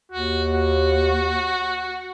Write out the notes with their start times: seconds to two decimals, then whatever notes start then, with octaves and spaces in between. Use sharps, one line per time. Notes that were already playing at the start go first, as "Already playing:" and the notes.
0.12 D#2 F#4
0.54 F#4